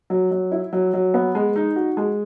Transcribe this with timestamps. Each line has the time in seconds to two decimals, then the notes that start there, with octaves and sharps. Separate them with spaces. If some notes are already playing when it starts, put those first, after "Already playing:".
0.10 F#3
0.31 F#3
0.52 E4
0.73 F#3
0.94 F#3
1.14 B3
1.35 G#3
1.56 D#4
1.76 F#4
1.97 G#3